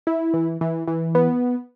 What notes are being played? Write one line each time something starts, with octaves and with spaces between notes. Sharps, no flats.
E4
E3
E3
E3
B3